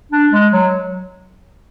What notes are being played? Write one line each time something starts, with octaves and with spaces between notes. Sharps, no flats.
D4
G#3
F#3